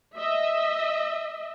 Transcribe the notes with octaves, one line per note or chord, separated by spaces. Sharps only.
D#5 E5